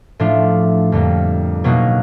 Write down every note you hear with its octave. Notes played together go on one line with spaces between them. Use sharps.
A2 F3 A3 D4 F4
F2 D3 G3 A#3
B2 F#3 A#3 D#4 F#4